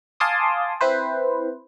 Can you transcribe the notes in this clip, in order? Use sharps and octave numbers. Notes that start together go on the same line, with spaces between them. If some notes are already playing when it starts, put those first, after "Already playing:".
F5 G#5 A5 C6 D6 D#6
C4 E4 B4 C5